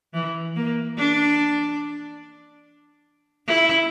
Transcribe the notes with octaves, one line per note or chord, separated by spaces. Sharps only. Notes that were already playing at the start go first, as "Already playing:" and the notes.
E3
A#3
D4
E4